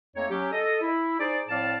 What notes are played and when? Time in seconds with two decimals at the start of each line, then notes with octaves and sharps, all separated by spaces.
0.16 F2 A3 A#3 D#4 C#5
0.30 F#3 C#4 G4
0.52 A4 D#5
0.81 E4
1.20 D#4 G#4 C5 D5
1.49 A2 F3 C4 D5 F5 A5